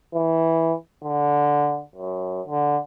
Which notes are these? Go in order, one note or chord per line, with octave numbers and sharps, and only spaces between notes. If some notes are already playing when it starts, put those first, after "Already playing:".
E3
D3
F#2
D3